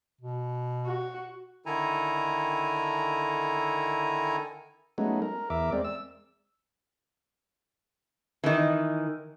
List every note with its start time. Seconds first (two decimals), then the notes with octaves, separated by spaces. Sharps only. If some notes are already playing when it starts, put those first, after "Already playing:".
0.21 B2
0.86 F#4
1.66 D3 D#3 E4 A4 G#5 A#5
4.98 F#3 G#3 A3 B3 C#4 D#4
5.22 A#4
5.50 E2 A#4 E5 D6
5.72 G#3 C4 D5
5.84 E6
8.44 D#3 E3